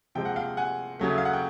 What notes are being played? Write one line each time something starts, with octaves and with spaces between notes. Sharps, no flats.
C3 F3 G#3 G5
F#5
F5 G5
F#5 G#5
F#2 C#3 F#3 A3
E5
F5
F#5
G5